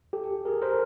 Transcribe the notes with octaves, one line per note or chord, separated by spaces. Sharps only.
G4 A4
G#4 A#4
A#4 C5